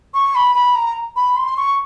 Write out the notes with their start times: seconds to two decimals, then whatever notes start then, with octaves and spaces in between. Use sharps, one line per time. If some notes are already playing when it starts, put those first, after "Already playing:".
0.14 C#6
0.35 B5
0.55 B5
0.75 A#5
1.16 B5
1.36 C6
1.57 C#6